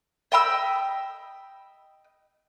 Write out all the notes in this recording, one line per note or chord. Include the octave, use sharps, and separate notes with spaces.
D#5 G5 B5 E6